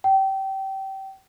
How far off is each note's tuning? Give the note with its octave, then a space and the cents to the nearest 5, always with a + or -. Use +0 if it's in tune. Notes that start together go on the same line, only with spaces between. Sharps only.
G5 -25